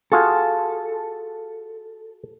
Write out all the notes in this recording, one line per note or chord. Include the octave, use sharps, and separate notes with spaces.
F4 F#4 G#4 A4